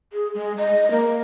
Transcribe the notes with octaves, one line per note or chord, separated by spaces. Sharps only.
G#4
G#3
D#5
A#3